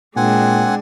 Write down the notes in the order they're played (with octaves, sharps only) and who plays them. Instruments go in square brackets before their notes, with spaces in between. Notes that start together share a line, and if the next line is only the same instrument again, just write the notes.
[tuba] A#2 [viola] G#3 D4 [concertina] C4 F#5 G#5